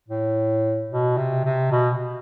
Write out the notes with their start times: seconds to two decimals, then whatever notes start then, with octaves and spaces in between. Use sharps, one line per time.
0.08 A2
0.91 B2
1.17 C3
1.45 C3
1.72 B2